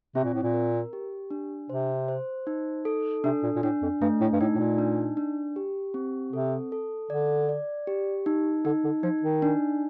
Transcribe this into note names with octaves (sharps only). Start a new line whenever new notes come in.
C3 C4
A#2
A2
A#2
A#4
G4
D4
C3 C5
C5
D#4
A4
C3 D4
A#2
A#2
A2 D4
F2
G2 A3
A2
G2
A2 D#4
A2
A#2
D4
D4
G4
C4
C3 A4
A4
D3 D5
D5
G4
D#4
D3 D#4
D3
F3 D#4
D#3
D4